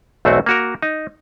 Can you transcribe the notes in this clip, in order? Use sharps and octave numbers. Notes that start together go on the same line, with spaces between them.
B1 E2 A3 C4 F#4
A#3 F#4 A#4
D#4